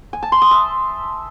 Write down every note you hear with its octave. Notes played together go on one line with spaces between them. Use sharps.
G#5
A5
C6
D#6
E5